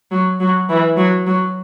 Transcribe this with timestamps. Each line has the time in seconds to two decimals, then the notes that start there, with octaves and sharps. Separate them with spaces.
0.11 F#3
0.40 F#3
0.69 E3
0.97 F#3
1.27 F#3